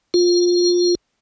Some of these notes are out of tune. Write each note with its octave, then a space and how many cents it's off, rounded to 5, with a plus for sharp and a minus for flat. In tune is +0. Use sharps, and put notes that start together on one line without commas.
F4 +20